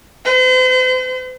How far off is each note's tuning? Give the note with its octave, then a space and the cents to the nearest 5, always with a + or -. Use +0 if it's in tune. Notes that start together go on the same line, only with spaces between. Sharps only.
C5 -40